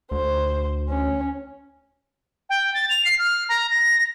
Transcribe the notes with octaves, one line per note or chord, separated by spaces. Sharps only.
D2 C5
C#4
G5
A6
F7
C7
F6
A#5
A#6